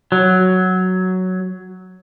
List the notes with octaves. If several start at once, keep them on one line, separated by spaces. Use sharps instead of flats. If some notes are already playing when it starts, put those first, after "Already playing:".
F#3